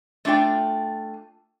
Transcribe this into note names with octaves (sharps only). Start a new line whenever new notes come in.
A3 D4 F4 G5